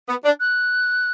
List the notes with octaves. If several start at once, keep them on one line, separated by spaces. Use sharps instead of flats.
B3
D4
F#6